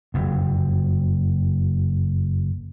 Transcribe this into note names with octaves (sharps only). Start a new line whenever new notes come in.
F#1 F2